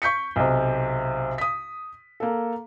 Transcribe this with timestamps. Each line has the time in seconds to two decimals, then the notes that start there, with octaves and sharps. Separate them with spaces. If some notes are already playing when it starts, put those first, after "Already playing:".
0.02 C#6 G6 B6 C#7
0.36 B1 C3
1.38 D#6 B6
2.20 A#3 A4